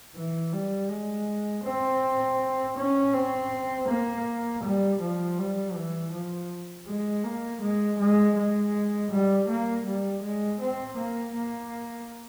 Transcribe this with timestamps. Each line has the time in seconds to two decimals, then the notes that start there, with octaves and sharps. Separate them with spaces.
0.16 E3
0.53 G3
0.89 G#3
1.64 C4
2.77 C#4
3.13 C4
3.89 A#3
4.63 G3
5.01 F3
5.38 G3
5.74 E3
6.12 F3
6.86 G#3
7.23 A#3
7.61 G#3
7.98 G#3
8.35 G#3
9.11 G3
9.48 A#3
9.86 G3
10.22 G#3
10.60 C4
10.97 A#3
11.35 A#3